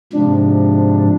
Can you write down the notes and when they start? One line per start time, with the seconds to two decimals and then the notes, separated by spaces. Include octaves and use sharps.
0.13 G#2 C3 F3 D4